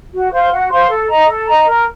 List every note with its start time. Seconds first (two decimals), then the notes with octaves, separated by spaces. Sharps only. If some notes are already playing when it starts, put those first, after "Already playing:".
0.13 F#4
0.32 C5 F5 C6
0.52 F#4
0.70 C5 F5 C6
0.89 A4
1.08 D#5 A#5
1.27 A4
1.46 D#5 A#5
1.65 A#4